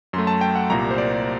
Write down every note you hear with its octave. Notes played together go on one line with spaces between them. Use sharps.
F#2 F#3 A3 C6
A5
G5
F#5
C2 A#2 G3 A#3 A#5
C5
D5